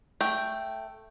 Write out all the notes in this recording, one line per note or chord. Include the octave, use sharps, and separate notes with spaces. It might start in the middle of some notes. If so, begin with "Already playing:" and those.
A3 G5